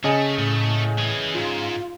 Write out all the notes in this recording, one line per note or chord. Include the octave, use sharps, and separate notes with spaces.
C#3 A3 D#5 G#5
A2 A3
E3 G#4
G#2 F4